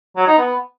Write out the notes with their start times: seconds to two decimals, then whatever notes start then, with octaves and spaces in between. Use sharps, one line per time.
0.16 F#3
0.27 D#4
0.38 B3